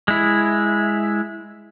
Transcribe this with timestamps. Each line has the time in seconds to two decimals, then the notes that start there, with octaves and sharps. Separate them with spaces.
0.08 G#3 E4